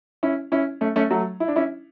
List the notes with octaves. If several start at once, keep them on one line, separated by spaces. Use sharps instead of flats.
C#4 E4
C#4 E4
A3 C#4
A3 C#4
F#3 A3
E4
D4
C#4 E4